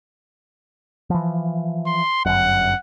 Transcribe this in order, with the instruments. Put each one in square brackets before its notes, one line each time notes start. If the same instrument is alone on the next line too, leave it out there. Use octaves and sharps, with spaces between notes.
[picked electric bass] E3 F3
[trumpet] C6
[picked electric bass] G1 F#2 [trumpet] F#5